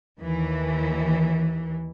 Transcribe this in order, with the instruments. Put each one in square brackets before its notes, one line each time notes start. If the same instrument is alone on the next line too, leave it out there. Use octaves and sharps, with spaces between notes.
[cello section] D#2 E3